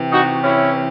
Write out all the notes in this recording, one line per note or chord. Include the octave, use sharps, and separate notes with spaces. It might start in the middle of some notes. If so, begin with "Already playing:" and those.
Already playing: C3 E3
D#4 F#4
C#4 E4